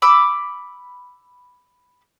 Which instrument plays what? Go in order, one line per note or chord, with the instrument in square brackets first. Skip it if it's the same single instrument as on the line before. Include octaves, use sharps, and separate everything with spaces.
[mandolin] B5 D6 E6